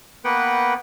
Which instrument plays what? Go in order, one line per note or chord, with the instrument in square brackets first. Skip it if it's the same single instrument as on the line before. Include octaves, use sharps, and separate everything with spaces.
[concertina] A#3 B3 B4 F#5 G5